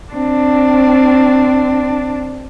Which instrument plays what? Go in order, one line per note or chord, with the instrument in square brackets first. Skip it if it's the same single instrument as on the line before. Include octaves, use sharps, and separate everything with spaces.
[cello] C4 D4